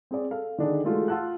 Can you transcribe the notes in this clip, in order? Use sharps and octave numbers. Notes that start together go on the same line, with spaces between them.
C4 G#4 D5
A4 F5
D3 D#3 D4 D#4 G#4
E3 G#3 A3 F4 F#4 G#4
F4 F#5 A5 E6 F#6